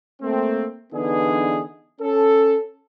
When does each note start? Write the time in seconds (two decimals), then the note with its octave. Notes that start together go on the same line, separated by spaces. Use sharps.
0.22 A3 A#3 C4
0.93 D3 E3 B3 D4 D#4 G#4
2.01 C#4 A4